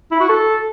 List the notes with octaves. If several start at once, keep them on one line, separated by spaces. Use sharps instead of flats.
E4
F#4
A4